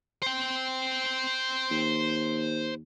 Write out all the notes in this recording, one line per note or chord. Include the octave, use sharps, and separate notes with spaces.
C5 G5
D#2